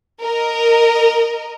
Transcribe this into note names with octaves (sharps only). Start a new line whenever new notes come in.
A#4 D#5